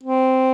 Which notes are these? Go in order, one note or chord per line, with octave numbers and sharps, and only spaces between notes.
C4